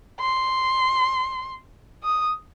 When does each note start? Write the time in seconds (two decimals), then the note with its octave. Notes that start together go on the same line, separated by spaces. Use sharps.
0.20 C6
2.04 D#6